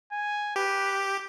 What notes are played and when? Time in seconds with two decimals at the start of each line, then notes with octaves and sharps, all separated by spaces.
0.12 G#5
0.56 G4 B4